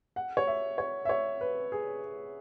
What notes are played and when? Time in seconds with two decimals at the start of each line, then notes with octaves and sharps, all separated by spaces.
0.16 F#5
0.37 C#5
0.47 E5
0.78 C#5
1.05 E5
1.09 C#5
1.41 B4
1.72 G#4